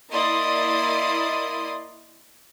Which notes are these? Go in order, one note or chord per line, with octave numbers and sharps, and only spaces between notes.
A#3 E4 D5 D#5 C6 D#6